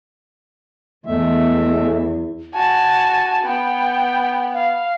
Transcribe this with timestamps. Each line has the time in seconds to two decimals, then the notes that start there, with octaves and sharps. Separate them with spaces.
1.06 E2 G#3 A3 E5
2.53 F#4 G#5 A5
3.43 B3 G5
4.54 F5